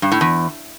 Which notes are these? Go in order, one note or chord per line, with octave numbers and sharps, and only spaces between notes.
G2
A2
E2